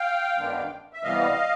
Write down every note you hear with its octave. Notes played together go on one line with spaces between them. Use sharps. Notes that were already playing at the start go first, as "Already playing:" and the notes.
Already playing: F5 G5
F#2 D#3 G#3 B3 D4
E5
C3 E3 G3 B3 D#5 F5